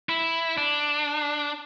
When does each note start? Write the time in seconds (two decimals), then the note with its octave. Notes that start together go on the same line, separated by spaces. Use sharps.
0.09 E4
0.58 D4